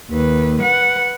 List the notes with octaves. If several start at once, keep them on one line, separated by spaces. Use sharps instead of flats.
D#2 B4
B4 F#5